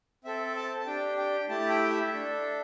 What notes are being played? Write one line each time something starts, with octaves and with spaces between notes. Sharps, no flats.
C4 A4 E5
A5
A5
D4 G4 G5
G5
A3 E4 G4 A5
G5
E5
D4 A4